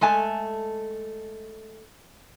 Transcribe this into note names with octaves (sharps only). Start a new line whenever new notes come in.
G#3 A3 G#5 A5